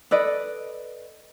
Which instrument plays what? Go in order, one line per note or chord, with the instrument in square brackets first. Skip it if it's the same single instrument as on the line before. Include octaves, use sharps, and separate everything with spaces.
[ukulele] A4 B4 D5 D#5